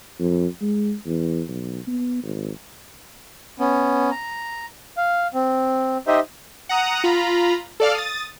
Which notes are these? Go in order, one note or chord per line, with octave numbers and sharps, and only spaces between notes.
F2
G#3
E2
B1
B3
G#1
B3 C#4
A#5
F5
C4
D#4 G4 C5 D#5 E5
F#5 A#5 D#6
F4 A#5 B5
A4 D5 F5 F6
D#6 A6